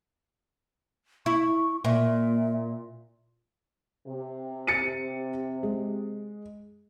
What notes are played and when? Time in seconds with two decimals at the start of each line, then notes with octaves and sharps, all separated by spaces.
1.26 E4 C#6
1.84 A#2 E5
4.06 C3
4.67 A6 C#7 D#7
5.63 G#3